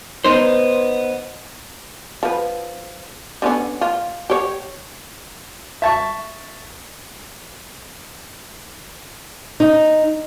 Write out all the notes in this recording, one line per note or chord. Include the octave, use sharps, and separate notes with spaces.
B3 D#4 C5
F3 B4
D3 B3 C#4
F4
G4 C#5
E5 A5 C#6
D#4